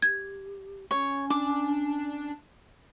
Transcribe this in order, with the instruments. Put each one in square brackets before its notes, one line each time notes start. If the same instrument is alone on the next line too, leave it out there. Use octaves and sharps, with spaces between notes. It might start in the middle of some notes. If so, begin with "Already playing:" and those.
[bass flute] G4 [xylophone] G#6
[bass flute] C#4 [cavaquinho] C#5
[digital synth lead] D4 [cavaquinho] D6